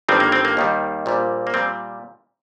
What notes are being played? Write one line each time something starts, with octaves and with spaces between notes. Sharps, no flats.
G1 G2 D#3 G3 C4
A#3
C4
A#3
D#2 D#3 G3
A#1 A#2 G3
A#3
A#2 G3 C4